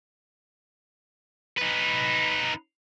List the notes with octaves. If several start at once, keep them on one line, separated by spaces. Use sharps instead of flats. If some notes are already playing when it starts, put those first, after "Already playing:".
D#4 B4